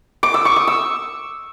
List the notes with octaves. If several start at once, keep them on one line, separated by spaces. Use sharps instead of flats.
D6
E6
C#6
D#6
E6